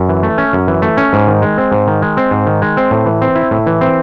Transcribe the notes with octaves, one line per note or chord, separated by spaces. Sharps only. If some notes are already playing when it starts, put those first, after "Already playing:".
Already playing: F#2
E3
A3
C#4
F#2
E3
A3
C#4
G#2
D#3
G#3
C4
G#2
D#3
G#3
C4
G#2
D#3
G#3
C4
A2
E3
C4
E4
A2
E3
C4